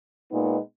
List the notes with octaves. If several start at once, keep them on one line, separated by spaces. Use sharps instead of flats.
A#2 G#3 B3 D#4